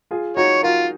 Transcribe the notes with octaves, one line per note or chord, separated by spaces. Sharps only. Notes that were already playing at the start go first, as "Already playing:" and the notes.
F4 G#4
D#4 F#4 C#5
F4 F#4 A#4